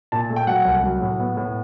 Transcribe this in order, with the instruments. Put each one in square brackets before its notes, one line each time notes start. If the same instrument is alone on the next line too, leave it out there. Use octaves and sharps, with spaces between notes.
[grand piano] A#2 A5
A3
G5
F#3 F#5
C2
F#3
A2
B3
A2